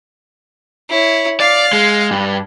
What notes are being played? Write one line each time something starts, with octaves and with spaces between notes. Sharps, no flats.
E4 C#5
D5 F5
G#3
G2